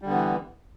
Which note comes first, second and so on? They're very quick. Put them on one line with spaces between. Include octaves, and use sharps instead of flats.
G3 D3 B3 E3